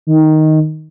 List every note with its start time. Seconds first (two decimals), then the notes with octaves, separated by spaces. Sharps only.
0.07 D#3